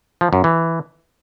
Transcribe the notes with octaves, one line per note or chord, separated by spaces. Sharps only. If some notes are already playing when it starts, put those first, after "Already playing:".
F3
F#2
E3